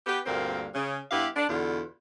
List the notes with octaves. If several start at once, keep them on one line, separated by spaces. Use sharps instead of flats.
B3 G4
D2 G2 A#2 A#3 C4
C#3
G2 B3 E4 G4 F5
D4
E2 B2 D3 F4